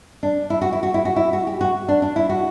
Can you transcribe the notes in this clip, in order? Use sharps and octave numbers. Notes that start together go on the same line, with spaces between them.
D4
E4
F#4
E4
F#4
E4
F#4
E4
F#4
G4
F#4
D4
D4
E4
F#4